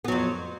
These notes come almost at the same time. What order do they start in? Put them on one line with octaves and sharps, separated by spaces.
B3 F#3 F2